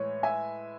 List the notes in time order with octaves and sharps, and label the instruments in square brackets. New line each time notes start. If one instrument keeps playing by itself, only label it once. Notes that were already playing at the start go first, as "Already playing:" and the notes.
Already playing: [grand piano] A2 E3 G#3 [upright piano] C#5
[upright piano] E5 G#5